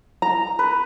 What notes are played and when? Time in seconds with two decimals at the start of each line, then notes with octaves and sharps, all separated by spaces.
0.22 A#5
0.59 B4